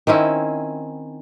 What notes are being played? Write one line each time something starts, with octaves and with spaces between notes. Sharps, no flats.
D#3 C4 C#4 E4